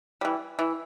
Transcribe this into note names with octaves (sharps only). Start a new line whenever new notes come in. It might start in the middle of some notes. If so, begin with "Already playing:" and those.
E3 G3
E3